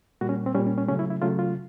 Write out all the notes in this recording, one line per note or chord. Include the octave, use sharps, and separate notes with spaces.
A#2 G3 F#4
C#4
C4
A#2 G3 C#4
C#4
C#4
C#3 F#3 A3 C#4
E4
E4
C#3 F#3 A3 F4
F4